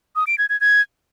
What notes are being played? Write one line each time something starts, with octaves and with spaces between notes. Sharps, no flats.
D#6
D7
G#6
G#6
G#6